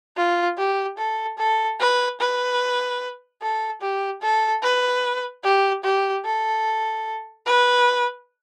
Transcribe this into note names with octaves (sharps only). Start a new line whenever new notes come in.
F4
G4
A4
A4
B4
B4
A4
G4
A4
B4
G4
G4
A4
B4